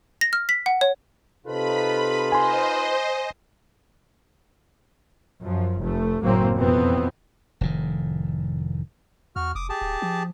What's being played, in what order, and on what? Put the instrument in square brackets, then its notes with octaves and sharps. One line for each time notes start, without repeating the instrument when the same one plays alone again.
[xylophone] A#6
F6
B6
F#5
C#5
[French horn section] C3 A4 [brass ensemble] D#4 F4 B4 [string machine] B5
[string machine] C5 D#5 [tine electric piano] G#5 C6
[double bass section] F#2 F3
F1 A3
F#1 A2 F#3 A#3 C4
F2 B2 E3 B3 C4
[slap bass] F1 A2 D#3
[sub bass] E2 [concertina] F#4 F6
[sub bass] F1 [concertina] D6 D#6
[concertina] G4 G#4 A5
[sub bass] D1
F3